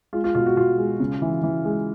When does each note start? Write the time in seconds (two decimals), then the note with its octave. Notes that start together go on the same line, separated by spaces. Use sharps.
0.13 G#3 F4
0.24 F4
0.35 B2 F4
0.46 F#4
0.56 B2 F4
0.78 G#3
1.00 C#3
1.22 E3
1.43 E3
1.65 G#3